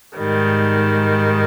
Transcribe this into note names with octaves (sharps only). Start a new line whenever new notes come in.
G#2 D#3 G3